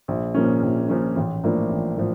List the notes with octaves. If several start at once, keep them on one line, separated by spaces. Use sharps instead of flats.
A#1
A#2 F3 A#3 C#4
A#1
A#2 F3 A#3 C#4
A1
A2 F3 A#3 D4
A1
A2 F3